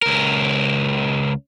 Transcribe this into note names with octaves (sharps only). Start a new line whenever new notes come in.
C#2 A#4